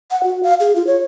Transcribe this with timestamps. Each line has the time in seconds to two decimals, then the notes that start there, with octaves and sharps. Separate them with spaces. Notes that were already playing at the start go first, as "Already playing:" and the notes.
0.11 F#5
0.24 F#4
0.43 F5
0.60 G#4
0.76 F4
0.87 C#5